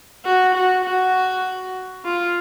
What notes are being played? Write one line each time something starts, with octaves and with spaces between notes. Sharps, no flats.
F#4
F#4
F#4
F4